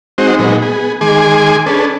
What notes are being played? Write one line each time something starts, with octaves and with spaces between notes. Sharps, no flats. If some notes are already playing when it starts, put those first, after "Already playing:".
G#3 C4 D#4 F#4 C5
A#2 F#3 G#3 B3 D#4
B3 G#4
D#3 G#3 G#4 G#5 C6 D6
C#4 D4 G#4 A4 B4